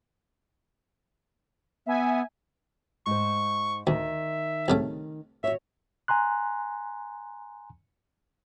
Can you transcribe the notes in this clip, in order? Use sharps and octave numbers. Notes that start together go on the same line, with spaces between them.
B3 E5 G#5
G#2 C5 C#6
D2 D#3 E5
C2 C#3 A3
F#4 C#5 E5
G#5 A#5 C6 F#6